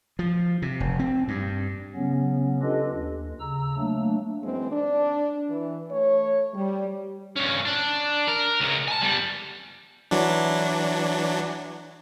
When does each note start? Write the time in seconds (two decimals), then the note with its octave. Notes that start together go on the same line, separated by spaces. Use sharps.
0.19 F3
0.62 C3
0.80 F1
0.99 C4
1.28 G2
1.95 C#3 F#3 B3 C#4
2.62 D4 F4 G4 A4 B4 D#5
2.92 D#2
3.40 C#3 A#5 E6
3.77 F#3 A3 A#3 D4
4.42 F#2 E3 G#3 C4
4.71 D4
5.49 E3
5.90 A3 C#5
6.53 G3
7.36 G2 C#4
7.65 D4
8.27 A#4
8.60 C#2 C#3
8.88 G#5 A5
9.02 G3 B3
10.11 E3 F#3 D4